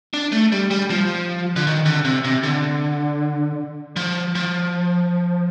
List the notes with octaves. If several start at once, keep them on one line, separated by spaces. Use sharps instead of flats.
D4
A3
G3
G3
F3
D3
D#3
D3
C3
C3
D3
F3
F3